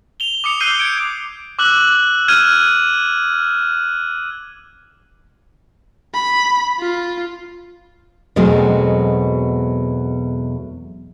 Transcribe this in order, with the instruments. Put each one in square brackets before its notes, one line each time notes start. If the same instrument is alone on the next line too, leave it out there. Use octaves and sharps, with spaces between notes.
[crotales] F7 G7
D6 D#6 C#7 F7
E6 F#6 G6 C7 D#7 G7
G6 G#6 C#7 D7
D6 E6 F#6 F#7
F6 G#6 D#7 E7
[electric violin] B5
F4
[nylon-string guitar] E2 B2 F#3 G#3 A3 C4